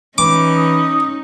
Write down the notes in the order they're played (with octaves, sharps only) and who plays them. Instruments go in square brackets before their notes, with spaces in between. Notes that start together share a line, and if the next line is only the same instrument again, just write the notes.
[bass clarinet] E3 [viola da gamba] C#4 D#4 [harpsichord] D6
[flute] D#6